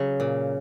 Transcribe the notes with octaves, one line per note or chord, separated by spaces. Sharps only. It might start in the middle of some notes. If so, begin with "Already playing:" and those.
Already playing: C#3 F#3
A#2